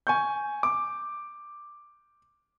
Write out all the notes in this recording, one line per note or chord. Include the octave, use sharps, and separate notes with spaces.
G#5 C#6 G6
D6